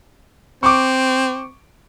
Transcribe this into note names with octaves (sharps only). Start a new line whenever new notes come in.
C4 C#6 D6